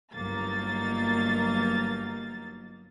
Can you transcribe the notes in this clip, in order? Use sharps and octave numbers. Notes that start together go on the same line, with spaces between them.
G1 F#3 A#3 D#4 A6